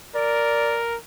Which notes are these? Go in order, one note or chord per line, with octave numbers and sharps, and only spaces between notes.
A#4 D5